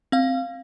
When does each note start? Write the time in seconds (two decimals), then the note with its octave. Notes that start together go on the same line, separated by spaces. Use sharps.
0.12 C4 F5